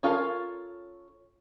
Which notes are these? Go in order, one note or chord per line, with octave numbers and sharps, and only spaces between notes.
C#4 F4 A4 A#4 F5